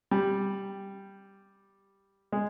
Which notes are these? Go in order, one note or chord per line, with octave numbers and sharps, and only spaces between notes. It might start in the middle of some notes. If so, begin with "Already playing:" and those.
G3
G#3